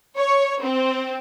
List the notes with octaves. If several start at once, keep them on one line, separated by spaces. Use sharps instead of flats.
C#5
C4